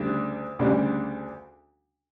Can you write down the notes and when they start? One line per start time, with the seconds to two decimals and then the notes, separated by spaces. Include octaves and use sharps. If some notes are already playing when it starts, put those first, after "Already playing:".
Already playing: D2 C#3 G3 D4
0.59 D2 C#3 G3 D4